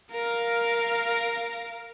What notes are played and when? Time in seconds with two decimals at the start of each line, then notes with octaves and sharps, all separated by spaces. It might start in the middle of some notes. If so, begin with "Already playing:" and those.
0.12 A#4 F5